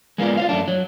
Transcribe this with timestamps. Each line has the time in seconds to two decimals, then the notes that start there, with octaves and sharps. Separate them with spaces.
0.18 G#3 A#3 B3 F4 D5
0.37 F4 C5 F5
0.49 F#2 A3 D4
0.68 F#3